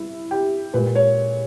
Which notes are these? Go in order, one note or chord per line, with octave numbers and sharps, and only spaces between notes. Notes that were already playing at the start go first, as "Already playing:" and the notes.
Already playing: G2 E4
G4
A#2 G#3 B4
C#5